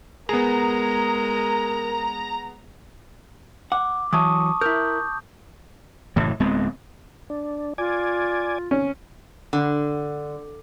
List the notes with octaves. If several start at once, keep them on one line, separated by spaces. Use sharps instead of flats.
G#3 B3 G#4 A#4 A#5
F#5 D6
E3 F#3 A5 C#6 D#6
E4 A#4 G6
F#1 A2 E3
D1 G#3 B3 C4
D4
F4 D5 G#5
C#4
D3